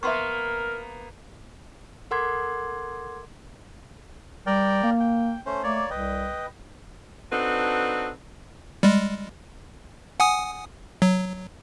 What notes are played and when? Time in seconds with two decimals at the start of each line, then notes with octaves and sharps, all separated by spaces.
0.03 A#3 B3 A#4 E5 C6 C#6
2.11 A4 A#4 F#5 C6 D6 G#6
4.46 G3 A#4 D5 G5
4.83 A#3
5.00 G5
5.46 A3 C#4 C5
5.63 A3 A#3 C#5 D5
5.90 C2 B4 D#5 G5
7.32 C4 D4 D#4 F#4 A4 B4
8.83 G3 G#3
10.20 F#5 G#5 D#6
11.02 F#3